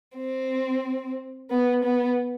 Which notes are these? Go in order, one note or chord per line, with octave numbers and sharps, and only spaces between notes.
C4
B3
B3